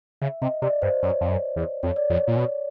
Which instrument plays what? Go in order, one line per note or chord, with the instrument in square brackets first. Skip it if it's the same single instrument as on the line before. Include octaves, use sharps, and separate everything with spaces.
[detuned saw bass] C#3 [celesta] E5
[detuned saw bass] C3 [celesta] D#5
[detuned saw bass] C3 [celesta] D5
[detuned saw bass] G2 [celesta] C5
[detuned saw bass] F#2 [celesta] C#5
[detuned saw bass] F2
F#2
E2
[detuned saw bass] F2 [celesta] C#5
[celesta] D5
[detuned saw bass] F2 [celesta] C#5
[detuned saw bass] A#2
B2